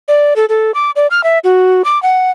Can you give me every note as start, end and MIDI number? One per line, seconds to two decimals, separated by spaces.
0.08 0.34 74
0.36 0.45 69
0.49 0.72 69
0.74 0.91 86
0.96 1.07 74
1.11 1.24 89
1.24 1.38 76
1.44 1.82 66
1.84 2.01 86
2.03 2.31 78